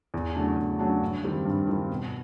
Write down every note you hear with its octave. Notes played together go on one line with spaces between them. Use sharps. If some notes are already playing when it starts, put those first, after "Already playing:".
E2
C#3 F#3 A3 D4
E2
C#3 F#3 A3 D4
G2
D#3 G3 C4
G2
D#3 G3 C4
B2